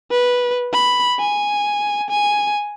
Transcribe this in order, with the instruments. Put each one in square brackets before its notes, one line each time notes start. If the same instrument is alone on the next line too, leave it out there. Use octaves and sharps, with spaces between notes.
[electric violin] B4
B5
G#5
G#5